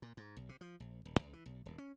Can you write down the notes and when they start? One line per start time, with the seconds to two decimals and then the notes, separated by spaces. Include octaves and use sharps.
0.02 A#2
0.17 G#2
0.37 B1
0.49 C3
0.61 F3
0.80 A#1
1.05 D#1
1.19 C#2
1.33 E3
1.46 B1
1.66 D#1
1.78 C#4